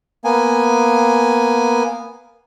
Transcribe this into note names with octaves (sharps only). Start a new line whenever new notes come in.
A#3 B3 G#5